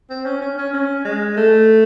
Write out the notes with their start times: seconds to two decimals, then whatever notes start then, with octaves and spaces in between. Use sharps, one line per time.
0.10 C4
0.26 C#4
0.41 C#4
0.58 C#4
0.73 C#4
1.05 G#3
1.37 A3